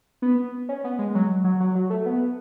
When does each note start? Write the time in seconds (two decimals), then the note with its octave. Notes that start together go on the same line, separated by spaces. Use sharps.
0.22 B3
0.69 C#4
0.84 B3
0.99 G#3
1.15 F#3
1.44 F#3
1.60 F#3
1.75 F#3
1.90 A3
2.06 B3